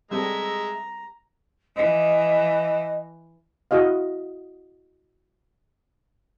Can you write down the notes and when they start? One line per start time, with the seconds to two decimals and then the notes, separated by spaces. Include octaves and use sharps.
0.11 G3 G#3 C4 A4 E5 A#5
1.76 E3 D#5
3.71 E4 F#4 D#5 F5